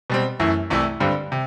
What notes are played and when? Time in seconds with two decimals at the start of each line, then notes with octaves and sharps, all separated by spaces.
0.10 B2 G3 C4
0.40 F#2 E3 A3 E4
0.70 C2 C3 E3 A3 E4
1.00 G2 D3 G3 C4
1.32 C3